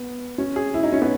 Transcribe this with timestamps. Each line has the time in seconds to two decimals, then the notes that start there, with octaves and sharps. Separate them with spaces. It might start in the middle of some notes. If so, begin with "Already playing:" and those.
Already playing: B3
0.38 C#4
0.56 G#4
0.74 E4
0.83 D#4
0.92 C#4
1.02 B3